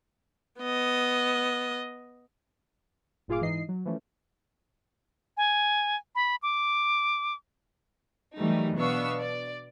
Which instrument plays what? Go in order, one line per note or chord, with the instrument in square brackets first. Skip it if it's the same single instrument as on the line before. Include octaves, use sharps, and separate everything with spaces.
[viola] B3 D#5
[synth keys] G1 A#2 F4 G#4 F5 D6
G#2 E3 D#4 D#5 C7
F#3
E3 F3 A3 C#4
[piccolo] G#5
B5
D6
[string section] D#3 E3 F#3 G3 A3 D#4
B2 B3 D4 F5 C#6 E6
D5